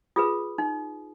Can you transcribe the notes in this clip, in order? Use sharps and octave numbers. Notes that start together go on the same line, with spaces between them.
F4 G#4 B4 D#6
D#4